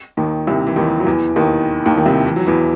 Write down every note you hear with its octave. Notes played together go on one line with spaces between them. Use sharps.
D#2 D#3
C2 C3
E3
D#2 D#3
F#3
E2 E3
D#2 D#3
D#2 D#3
D#3
C2 C3
E3
F#3
E2 E3